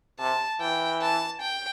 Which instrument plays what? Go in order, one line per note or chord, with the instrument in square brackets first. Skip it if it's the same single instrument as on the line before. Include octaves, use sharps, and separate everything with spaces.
[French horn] C3 [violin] A5
[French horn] E3 [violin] G5
[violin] A5
G5